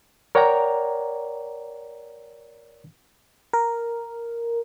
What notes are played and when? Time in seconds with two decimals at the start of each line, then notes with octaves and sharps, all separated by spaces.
0.35 A#4 C#5 D5 F#5 G5 A#5
3.53 A#4